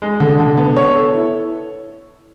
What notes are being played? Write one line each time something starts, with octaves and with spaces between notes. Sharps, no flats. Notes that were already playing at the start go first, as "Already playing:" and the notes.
G#3
D3
D3
B3
C#5
A4
E4